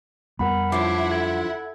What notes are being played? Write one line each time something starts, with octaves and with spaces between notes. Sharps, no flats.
F2 G3 B3 A#4 F#5 B5
F#2 D3 F3 E4 F#5 D6 C7
A4 G#6